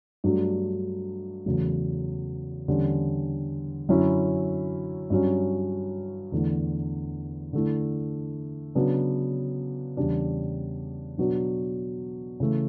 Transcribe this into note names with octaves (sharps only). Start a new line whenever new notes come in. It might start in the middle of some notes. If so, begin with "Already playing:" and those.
G2 F#3 A3 D4
E2 C#3 F#3 A3
E2 D3 G3 C#4
F#2 D3 F#3 C#4 E4
G2 F#3 C#4
E2 D3 A3 E4
D3 A3 E4
C#3 F#3 B3 D4
E2 C#3 G3 D4
B2 F#3 B3 D4
C#3 E3 A3